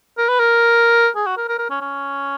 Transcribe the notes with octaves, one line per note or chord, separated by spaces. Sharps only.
A#4
B4
A#4
G#4
F#4
A#4
A#4
A#4
C#4
C#4